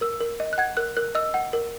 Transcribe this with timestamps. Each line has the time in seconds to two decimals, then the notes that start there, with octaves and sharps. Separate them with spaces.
0.01 A#4 E6
0.21 A#4
0.40 D#5
0.53 F#6
0.58 F#5 G#6
0.77 A#4 F#6
0.97 A#4 F#6
1.15 D#5 E6
1.34 F#5
1.53 A#4